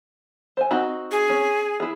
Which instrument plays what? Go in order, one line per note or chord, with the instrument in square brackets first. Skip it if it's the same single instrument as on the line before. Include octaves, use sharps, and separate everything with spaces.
[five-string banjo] C5 G#5
C4 D#4 F#4
[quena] G#4
[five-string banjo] C#4
E4 G#4